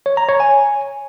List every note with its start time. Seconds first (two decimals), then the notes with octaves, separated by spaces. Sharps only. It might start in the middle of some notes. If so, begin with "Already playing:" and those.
0.06 C#5
0.17 A#5
0.29 C#5
0.40 G#5